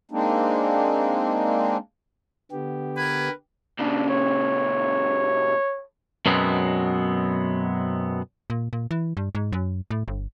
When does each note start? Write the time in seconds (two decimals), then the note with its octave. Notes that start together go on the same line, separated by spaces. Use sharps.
0.11 G#3 A#3 C4 D4 D#4
2.51 D3 B3 G4
2.97 A#4 B4 G#6
3.80 A#2 C#3 D4
4.09 C#5
6.26 F#2 B2 F#3 G#3 B3 C4
8.50 A#2
8.73 A#2
8.91 E3
9.17 G2
9.35 G#2
9.53 F#2
9.91 A2
10.08 G1